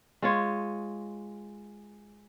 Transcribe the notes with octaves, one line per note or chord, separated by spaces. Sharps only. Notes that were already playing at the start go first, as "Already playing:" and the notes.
G#3 F4 C#5